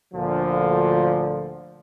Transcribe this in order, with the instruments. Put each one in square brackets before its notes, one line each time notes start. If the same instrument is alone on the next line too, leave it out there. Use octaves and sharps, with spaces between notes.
[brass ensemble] D2 A#2 D3 F3